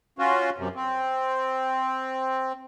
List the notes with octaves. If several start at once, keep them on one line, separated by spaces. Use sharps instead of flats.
C#4 F4 F#4
F#2 C3
C4